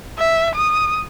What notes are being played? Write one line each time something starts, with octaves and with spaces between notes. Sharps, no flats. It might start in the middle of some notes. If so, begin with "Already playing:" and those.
E5
D#6